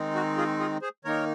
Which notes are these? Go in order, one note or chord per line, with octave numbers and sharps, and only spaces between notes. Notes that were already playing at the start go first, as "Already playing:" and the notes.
Already playing: D#3 G#3 C4 D#4
F#4
F4 G#4
F4 G#4
G#4 C5
D#3 A#3 D#4 A#4 C#5